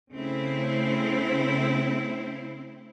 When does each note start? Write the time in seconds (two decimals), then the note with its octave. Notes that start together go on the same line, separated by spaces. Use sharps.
0.11 C#3 A3 C4 E4